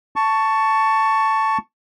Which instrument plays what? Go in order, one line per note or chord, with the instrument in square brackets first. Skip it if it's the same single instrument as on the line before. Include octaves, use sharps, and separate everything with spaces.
[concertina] A5 C#6